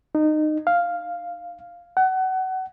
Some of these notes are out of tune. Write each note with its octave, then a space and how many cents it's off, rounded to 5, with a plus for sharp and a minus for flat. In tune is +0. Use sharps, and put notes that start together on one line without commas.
D#4 -20
F5 +0
F#5 +25